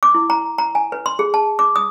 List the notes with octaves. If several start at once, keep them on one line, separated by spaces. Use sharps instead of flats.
D6
E4
A#5
A#5
G#5
B4
C6
G#4
A5
D6
D#6